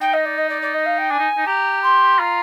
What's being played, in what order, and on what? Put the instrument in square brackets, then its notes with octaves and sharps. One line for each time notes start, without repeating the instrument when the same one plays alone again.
[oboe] D#4 [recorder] G5
[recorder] D#5
D5
D#5
D5
D5
D#5
F5
G5
[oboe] D4 [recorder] G#5
[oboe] D#4
D#4
[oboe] G4 [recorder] A#5
[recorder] C6
[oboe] F4 [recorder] A#5